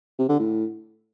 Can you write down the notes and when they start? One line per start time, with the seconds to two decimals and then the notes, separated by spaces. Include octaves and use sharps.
0.19 C3
0.29 D3
0.39 A2